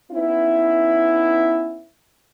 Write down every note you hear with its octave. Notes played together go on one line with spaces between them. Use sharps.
B3 C#4 D#4 E4